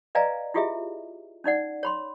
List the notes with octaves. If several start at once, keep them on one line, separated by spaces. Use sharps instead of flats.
B4 D5 D#5 F5 G#5 A#5
E4 F4 G4 G#4 D#5 E5
C#4 D#4 D5 F#5
C#5 B5 C6